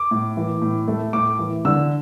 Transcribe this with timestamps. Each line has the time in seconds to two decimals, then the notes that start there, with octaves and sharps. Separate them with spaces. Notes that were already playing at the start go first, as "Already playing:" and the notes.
Already playing: D6
0.11 A2
0.37 E3
0.62 A2
0.88 A3
1.13 A2 D6
1.39 E3
1.65 D3 E6